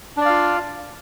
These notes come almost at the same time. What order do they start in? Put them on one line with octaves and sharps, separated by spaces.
D4 D5 F5 F4